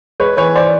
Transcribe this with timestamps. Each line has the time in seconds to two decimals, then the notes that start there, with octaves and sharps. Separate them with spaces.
0.20 G#3 B4 C#5
0.37 E3 B4 C#5
0.55 C5 D5